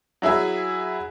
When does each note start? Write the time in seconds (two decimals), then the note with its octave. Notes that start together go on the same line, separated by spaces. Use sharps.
0.22 F#3 E4 G#4 E5